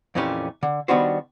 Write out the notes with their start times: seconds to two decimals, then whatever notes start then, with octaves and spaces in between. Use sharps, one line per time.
0.15 F2 A#2 E3 A3 C#4 G4
0.63 D3
0.88 D#3 G3 B3 D4 F#4 C5